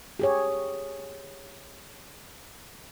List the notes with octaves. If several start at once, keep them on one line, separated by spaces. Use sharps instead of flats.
G4 G#4 C#5